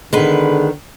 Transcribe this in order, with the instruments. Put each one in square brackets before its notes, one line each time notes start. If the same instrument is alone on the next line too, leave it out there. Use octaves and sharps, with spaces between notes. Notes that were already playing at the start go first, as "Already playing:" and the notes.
[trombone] D3 [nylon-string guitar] D#3 B3 [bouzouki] G#3 B4